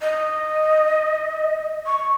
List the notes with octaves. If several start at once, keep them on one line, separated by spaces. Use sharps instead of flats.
D#5
C#6